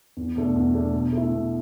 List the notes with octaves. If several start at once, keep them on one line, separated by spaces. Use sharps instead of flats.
E2
B2 A3 D4
E2
B2 A3 D4
B2
A3 E4
B2